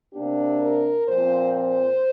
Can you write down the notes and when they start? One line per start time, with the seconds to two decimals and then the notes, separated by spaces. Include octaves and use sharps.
0.13 C3 A#3 D4 G4
0.61 A#4
1.08 A#2 F3 C4 C5
1.55 C5